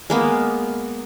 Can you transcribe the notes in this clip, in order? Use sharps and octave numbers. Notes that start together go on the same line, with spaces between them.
G#3 A#3 B3